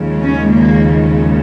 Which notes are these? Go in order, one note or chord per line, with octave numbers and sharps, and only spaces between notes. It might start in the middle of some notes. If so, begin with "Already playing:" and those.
Already playing: D#2 C#3 F3 G#3
C#4
A#3
G#3